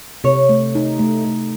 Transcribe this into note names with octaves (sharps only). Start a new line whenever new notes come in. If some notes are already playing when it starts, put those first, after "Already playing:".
C3 C#5
A3
D#4
A3
A3